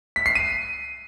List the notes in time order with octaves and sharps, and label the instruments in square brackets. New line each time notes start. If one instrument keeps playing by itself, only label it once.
[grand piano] B6
C7
D#7